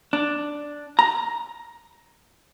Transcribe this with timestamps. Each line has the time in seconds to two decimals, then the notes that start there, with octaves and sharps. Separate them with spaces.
0.13 D4
0.99 A#5